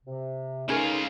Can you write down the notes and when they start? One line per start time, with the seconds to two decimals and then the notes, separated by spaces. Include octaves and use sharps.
0.05 C3
0.69 C#3 G#3 A3 C#4 D#4 F4 G#4 A#4